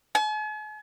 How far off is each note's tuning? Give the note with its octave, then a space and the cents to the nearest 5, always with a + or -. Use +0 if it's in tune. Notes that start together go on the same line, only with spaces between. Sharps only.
G#5 +45